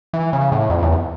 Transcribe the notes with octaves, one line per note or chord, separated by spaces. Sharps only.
E3
C#3
A2
F2
E2